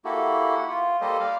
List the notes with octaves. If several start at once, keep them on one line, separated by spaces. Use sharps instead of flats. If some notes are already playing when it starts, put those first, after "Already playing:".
A#3 E4 F#4 G4 A4
F#5
F4
G3 A#3 G4 A4 C5 D#5
D5 F5